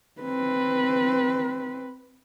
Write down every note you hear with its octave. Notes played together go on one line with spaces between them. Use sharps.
C4 B4